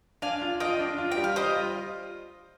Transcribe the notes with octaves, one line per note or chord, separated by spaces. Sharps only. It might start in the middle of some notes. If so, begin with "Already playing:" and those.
D4 F5 G#5
F4
F4 D#5 G5
D4
F4
G5
G3
F5
G3 C5 D#5
F4